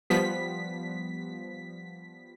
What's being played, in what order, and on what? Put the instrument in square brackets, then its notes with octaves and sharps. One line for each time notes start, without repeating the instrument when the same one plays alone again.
[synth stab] F3 G3 B3 B6